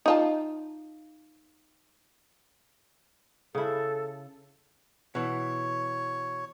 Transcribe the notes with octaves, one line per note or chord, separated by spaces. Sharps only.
D#4 F4 A5
C#3 E4 A4
B2 E3 C#5